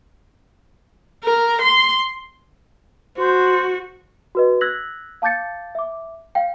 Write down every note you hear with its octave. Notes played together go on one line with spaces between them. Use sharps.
A#4
C6
F#4 C5
F#4 B4 D#5
E6 F#6 G#6 A#6 B6 F#7
F5 A5 D6 G6 A6 C#7
E5 D6
F5 G5